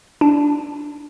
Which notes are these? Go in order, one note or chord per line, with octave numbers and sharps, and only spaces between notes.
D4